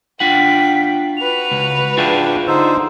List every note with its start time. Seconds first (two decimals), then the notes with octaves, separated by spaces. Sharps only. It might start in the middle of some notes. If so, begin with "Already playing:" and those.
0.20 D4 F4 F#5 G5 B6
1.17 F#4 B4 F7
1.51 C#2
1.98 D4 F4 G#4 E5 G5
2.48 D3 D#4 C5 E6